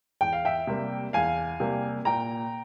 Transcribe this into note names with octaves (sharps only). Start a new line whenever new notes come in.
E2 G5
F5
E5 G5
C3 G3 A#3
E2 F5 G#5
C3 G3 A#3
A#2 G5 A#5